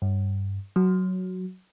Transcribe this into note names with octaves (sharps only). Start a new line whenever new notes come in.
G2
F#3